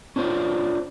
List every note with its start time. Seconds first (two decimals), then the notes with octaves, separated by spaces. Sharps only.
0.16 C#4 D4 F4 C5 C#5